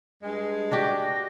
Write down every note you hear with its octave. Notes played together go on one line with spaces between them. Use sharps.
G2 G#3
D4 F#4 G4 A#6